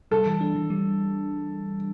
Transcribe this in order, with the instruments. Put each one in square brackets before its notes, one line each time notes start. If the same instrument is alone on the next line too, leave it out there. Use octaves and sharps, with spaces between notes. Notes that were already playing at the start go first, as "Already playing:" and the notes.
[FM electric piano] G3 [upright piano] A4
[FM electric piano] E3
D4
E3
G3